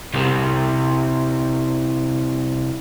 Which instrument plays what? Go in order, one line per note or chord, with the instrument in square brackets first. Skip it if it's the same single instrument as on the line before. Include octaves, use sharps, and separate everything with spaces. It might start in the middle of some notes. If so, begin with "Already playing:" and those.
[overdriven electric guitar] C2 C3